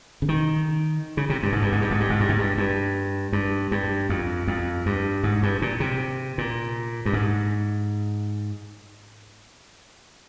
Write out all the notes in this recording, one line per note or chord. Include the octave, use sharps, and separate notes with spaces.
C#3
D#3
C#3
C3
G2
G#2
G2
G#2
G2
G#2
G2
G#2
G2
G#2
G2
G2
G2
G2
F2
F2
G2
G#2
G2
A#2
C3
A#2
G2
G#2